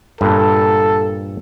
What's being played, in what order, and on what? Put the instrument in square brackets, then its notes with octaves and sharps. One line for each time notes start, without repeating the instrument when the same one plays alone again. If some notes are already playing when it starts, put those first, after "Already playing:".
[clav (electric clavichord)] G2 A#2 [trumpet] A4